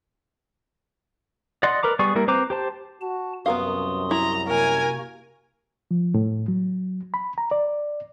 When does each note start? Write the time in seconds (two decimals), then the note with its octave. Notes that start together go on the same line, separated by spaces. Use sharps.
1.63 D5 D#5 F#5 C6
1.83 A#4 B4 A#5 D6
1.99 G3 B3 G#4 D5 C#6
2.15 G3 A#3 E4 A#4
2.28 C4 B4 C5 A#5 D6
2.50 G4 C5 A5
3.01 F#4 A5
3.46 C2 F#2 B3 F#4 A#4 F5 C6 D#6
4.11 E4 A#5
4.47 C3 A#3 F#4 A#4 G#5
5.91 F3
6.14 A2
6.48 F#3
7.14 B5
7.38 A#5
7.51 D5